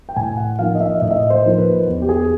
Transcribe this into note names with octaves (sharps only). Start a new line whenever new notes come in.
G5
A2 G#5
F#5
F3 A#3 D#4 F5
D#5
E5
A2 D#5
E5
D#5
C5
F3 A#3 D#4
B4
E2
G4
G#4